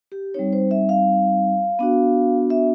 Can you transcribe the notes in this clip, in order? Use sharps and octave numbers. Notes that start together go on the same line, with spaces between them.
G4
G3 C4 D#4 C#5
C5
E5
F5
B3 D4 F#4
E5